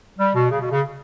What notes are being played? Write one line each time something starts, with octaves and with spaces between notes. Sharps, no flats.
G3
B2
C#3
B2
C#3